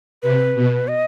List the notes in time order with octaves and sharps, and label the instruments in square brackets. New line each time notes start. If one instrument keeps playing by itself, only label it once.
[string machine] C3 [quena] B4
[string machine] B2
[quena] D#5